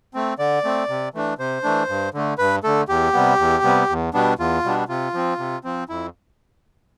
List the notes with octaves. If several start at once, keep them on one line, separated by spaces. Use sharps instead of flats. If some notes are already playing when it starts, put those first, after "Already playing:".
A3 C4
D3 D5
A3 C4
C3
E3 A3 D4
C3 C5
E3 A3 D4
G2
D3 A3
G2 B4
D3 A3 A4
E2 G4
C3 G3 B3
E2
C3 G3 B3
E2
B2 G3 B3 D4
E2 F4
B2 G3 B3 D4
C3 F4
F3 C4
C3
F3 C4
F2 E4